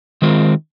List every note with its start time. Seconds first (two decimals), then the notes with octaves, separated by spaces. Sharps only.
0.22 D#3 G#3 C4 F4 A#4